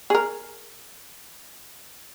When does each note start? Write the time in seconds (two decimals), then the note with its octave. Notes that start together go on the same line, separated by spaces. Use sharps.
0.10 G#4 A#4